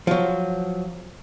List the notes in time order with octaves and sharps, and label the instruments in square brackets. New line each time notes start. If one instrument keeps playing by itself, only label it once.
[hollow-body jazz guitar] F3 F#3